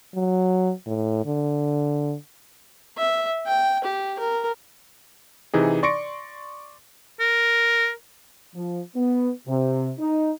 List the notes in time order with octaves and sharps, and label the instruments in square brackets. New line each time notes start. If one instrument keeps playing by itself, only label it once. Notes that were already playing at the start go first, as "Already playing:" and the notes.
[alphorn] F#3
A2
D3
[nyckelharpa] E5
G5
G4
A#4
[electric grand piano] C3 E3 D#4 G#4
D5 C6 C#6 A#6 C#7 D7
[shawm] A#4
[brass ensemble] F3
B3
C3
D#4